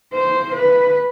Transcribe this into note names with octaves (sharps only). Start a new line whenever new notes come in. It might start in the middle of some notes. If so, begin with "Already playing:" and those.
C5
B4